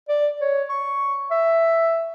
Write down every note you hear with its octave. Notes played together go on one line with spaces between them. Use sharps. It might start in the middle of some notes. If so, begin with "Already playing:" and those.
D5
C#5
C#6
E5